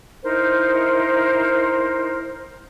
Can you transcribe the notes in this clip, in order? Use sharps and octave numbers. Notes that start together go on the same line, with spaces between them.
D#4 E4 A#4 C5